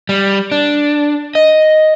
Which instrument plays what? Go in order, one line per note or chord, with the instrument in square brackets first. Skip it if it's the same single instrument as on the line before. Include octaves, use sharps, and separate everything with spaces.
[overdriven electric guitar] G3
D4
D#5